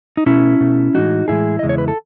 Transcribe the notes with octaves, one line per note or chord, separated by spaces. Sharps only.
D#4
B2 A3 C#4 E4
B2 A3
A2 E3 G#3 D#4 F#4
A2 E3 G#3 E4 G#4
E2 C#3 G#3 D#5
C#5
B4
A4